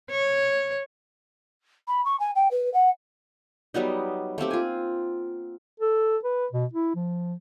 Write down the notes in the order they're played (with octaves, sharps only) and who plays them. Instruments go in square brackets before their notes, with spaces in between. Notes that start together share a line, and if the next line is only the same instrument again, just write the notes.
[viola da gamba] C#5
[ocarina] B5
C#6
G#5
G5
B4
F#5
[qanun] F#3 G3 B3 D#4
A3 A#3 C4 G4
F4 G#5
[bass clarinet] A4
B4
B2
E4
F3